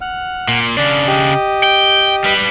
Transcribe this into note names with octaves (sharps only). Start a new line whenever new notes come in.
F#5 F6
A#2
C#3 D4 D5
G4 D#5
G5
G3 B4